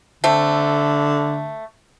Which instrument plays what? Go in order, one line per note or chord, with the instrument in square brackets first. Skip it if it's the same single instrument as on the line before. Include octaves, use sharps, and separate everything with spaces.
[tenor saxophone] D3 [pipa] A3 C4